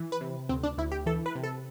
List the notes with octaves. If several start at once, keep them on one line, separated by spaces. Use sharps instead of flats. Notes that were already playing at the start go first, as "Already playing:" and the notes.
Already playing: E3
B4
C3
D2 C4
D4
D2 E4
G4
E3 A4
B4
C3
A4